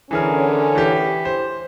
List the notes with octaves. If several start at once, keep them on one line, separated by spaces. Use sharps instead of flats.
D3 E3 C#4 G#4 A#4
E3 G4
C5